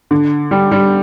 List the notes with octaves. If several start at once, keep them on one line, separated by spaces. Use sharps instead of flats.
D3
G3
G3